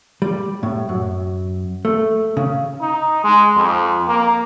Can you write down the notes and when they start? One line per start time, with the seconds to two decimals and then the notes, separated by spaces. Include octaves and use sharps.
0.22 G3
0.63 A2
0.89 F#2
1.85 A3
2.37 C#3
2.81 D#4
3.24 G#3
3.57 F2
4.08 A#3